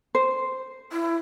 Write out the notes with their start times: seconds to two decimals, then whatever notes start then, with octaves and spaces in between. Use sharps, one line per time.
0.15 C5
0.92 E4